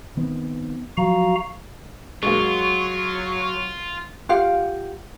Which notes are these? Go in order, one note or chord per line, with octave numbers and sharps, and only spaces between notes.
D#3 B3 C4
F3 F#3 F#4 F5 A#5
F#3 G#3 A#3 F4 C#6
F4 G4 F5 F#5